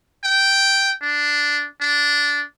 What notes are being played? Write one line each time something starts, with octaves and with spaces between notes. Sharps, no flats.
G5
D4
D4